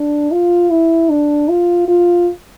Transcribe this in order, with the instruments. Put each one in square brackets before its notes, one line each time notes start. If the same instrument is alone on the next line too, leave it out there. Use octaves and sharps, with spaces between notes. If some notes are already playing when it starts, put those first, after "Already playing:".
Already playing: [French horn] D4
F4
E4
D4
F4
F4